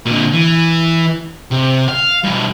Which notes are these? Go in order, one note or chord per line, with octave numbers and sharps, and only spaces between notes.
A#2 D3
E3
C3
F5
G2 B2